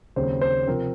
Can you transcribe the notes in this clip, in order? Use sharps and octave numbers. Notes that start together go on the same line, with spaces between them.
D#2 C#3 F#3 C4 C5
C5
C3 F3 C4 A#4